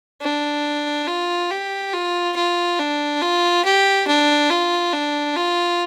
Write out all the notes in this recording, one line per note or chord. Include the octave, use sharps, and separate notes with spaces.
D4
F4
G4
F4
F4
D4
F4
G4
D4
F4
D4
F4